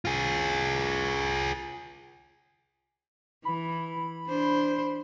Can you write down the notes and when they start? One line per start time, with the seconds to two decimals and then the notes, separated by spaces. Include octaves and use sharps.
0.05 F4 G#4
3.45 E3 B5
4.27 D4 C5